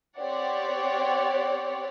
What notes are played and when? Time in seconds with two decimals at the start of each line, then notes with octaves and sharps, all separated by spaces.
0.18 C4 G4 C#5 D5 F#5